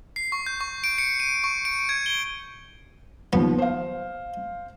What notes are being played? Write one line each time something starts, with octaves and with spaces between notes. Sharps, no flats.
C7
C#6
G6
C#6
D7
C#7
D#7
C#6
D7
G#6
G7
D#2 F3 B3
C5 F5